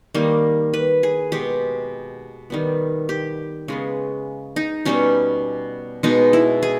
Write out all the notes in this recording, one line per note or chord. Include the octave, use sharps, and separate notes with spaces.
D#3 G3 A#3
B4
G#4
B2 G#3 B3 G4
D#3 G3 B3
G4
C#3 G#3 B3
D#4
B2 G3 B3 C#4
B2 G#3 B3 D#4
E4
G#4